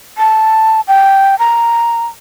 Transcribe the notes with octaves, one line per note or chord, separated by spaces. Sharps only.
A5
G5
A#5